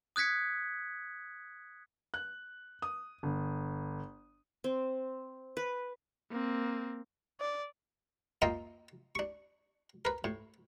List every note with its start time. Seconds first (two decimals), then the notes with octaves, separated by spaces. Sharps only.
0.16 D#6 F#6 G#6 B6 C#7
2.14 F#6
2.82 D#6
3.23 G1
4.64 C4
5.57 B4
6.31 A#3 C4
7.40 D5
8.42 A#3 F4 A#4 D#5 E5 G5
9.15 D4 C#6
10.05 A#4 B4
10.24 A2